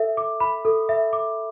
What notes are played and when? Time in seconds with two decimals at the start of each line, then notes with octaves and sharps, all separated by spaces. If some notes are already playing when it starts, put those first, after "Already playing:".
Already playing: A4 E5
0.17 D6
0.40 B5
0.65 A4
0.89 E5
1.13 D6